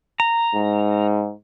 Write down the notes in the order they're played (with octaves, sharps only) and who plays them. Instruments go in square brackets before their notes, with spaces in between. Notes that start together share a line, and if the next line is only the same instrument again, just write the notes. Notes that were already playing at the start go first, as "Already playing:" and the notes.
[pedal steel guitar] A#5
[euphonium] G#2